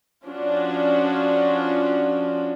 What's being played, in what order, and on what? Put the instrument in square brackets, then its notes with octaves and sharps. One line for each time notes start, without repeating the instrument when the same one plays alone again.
[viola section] F3 C#4 D4 F4 F#4